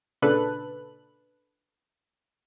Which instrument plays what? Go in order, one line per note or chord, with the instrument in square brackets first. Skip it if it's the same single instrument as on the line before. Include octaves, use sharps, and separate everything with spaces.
[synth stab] A#2 C#3 D4 A4 B4 F#6